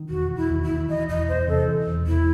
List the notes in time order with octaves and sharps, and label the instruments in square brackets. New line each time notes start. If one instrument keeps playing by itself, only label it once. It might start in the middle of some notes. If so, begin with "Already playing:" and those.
Already playing: [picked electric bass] D#3
[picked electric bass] E1 [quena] F#4
[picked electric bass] E1
[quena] E4
[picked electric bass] D#2
[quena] E4
[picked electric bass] D#3
[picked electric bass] E3 [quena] D#5
[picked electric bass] E1 [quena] D#5
[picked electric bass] E2 [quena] C5
[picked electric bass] C3 [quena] A4
[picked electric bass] E3
E1
[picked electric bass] E2 [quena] E4